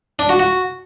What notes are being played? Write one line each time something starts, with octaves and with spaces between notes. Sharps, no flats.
D4
F#4
F#4